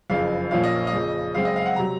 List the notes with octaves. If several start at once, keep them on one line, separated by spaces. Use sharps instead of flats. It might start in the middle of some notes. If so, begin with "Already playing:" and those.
F#1 F2 C#3 F3 F5
A#1 A#2 F3 A#3 C#4 F5
D#5
D#5
F2 C#3 F3
F#2 C#3 G#3 C4 F5
D#5
F5
F#5
C3 F#3 A#5